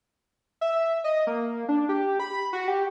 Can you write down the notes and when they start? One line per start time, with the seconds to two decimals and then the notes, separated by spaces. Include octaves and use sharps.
0.61 E5
1.04 D#5
1.27 A#3
1.69 D4
1.89 G4
2.20 B5
2.53 F#4
2.68 G4